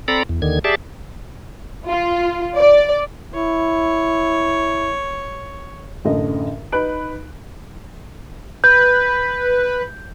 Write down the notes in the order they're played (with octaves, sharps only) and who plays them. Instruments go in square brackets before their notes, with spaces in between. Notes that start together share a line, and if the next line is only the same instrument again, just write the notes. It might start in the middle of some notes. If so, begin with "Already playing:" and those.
[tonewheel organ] C4 A4 D5 A#5 B5
E2
D#2 D3 D#3 G#6
G4 G#4 D5 E5 A5
[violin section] F4
D5
[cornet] E4 [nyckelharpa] C#5
[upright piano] A1 F#2 D3 A4 D#5
D#4 B4 F#6 D7
[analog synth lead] B4 [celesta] G6